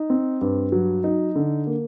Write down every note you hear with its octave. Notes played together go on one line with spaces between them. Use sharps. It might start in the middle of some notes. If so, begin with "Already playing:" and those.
Already playing: D#4
C4
G2
F#3
D#4
D3
A#3